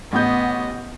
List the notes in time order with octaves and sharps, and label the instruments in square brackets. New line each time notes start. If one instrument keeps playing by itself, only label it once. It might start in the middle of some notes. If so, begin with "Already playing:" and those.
[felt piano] A1 G6 [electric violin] B3 D#5